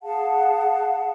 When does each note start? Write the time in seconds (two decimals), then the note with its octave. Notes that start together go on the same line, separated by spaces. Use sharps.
0.03 G#4 F5 F#5 A5